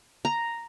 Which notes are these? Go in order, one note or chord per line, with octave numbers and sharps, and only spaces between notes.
A#5